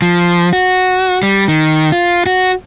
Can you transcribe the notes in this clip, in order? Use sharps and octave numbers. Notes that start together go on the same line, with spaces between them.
F3
F#4
G3
D#3
F4
F#4